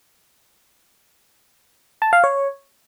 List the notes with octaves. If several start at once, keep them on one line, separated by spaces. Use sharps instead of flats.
A5
F5
C#5